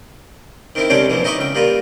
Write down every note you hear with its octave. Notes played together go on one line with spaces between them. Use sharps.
D#3 C4 E4
C2 C3 G#3 C#4 D4 G5
A#1 B2 E3
D#4 D#5 E5 B5 C#6 D6
C#2 G5
G3 A#3 F4